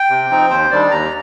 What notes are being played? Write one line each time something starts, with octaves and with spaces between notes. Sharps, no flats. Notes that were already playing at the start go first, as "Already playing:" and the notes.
Already playing: G5
C3
F3 C4 D#4
D#2 C5
D#3 G3 D4 D5
D#2 A#5